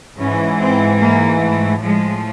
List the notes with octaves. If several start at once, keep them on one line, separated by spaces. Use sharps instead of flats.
G#2 E3 C#4
C4
A#3
A3
A2 F3 G#3